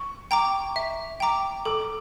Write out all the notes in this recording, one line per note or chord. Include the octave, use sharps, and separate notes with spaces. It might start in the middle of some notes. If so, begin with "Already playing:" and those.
Already playing: C#6
G5 A#5 D6
E5
G5 A#5 D6
A4 D6